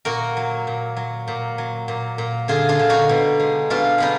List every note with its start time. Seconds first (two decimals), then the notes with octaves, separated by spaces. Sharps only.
0.05 A#2 F#4 A#4
0.37 F#3
0.67 A#2
0.96 F#3
1.28 A#2
1.58 F#3
1.88 A#2
2.18 A#2
2.48 D3 F4 G#4
2.69 D4 F4
2.79 D3
2.90 D#4 F#4
3.09 B2
3.40 G#3
3.70 B2 D4 F4
3.98 G#3 B3 D#4